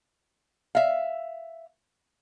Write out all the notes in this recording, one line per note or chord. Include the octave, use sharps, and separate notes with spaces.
E5 F5